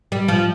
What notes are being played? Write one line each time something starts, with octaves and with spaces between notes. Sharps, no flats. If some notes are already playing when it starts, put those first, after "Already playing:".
G3
F3